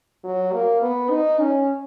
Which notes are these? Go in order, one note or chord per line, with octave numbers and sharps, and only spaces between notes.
F#3
A#3
B3
D#4
C#4